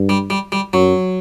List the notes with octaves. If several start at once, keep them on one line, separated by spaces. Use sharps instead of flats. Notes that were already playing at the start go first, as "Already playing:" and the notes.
Already playing: G2
G3
G3
G3
F#2 F#3